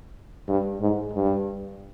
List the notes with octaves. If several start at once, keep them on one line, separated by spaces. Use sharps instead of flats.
G2
G#2
G2